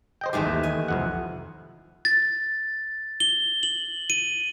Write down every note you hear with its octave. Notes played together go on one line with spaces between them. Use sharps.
C5 D#5 G5
G#1 D#3 E3 G#3 A3 G4
D#2
G#5
C2 F2 F#5
A6
G7
F#7
D#7